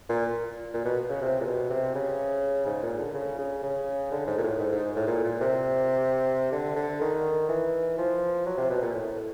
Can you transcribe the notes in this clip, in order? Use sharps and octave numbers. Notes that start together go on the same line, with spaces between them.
A#2
A#2
B2
C#3
C3
A#2
B2
C3
C#3
G#2
A#2
D3
C#3
C#3
C#3
D3
G#2
A#2
A2
G#2
G#2
A2
A#2
A#2
C3
D3
D3
D#3
E3
F3
F#3
C3
B2
A#2
A2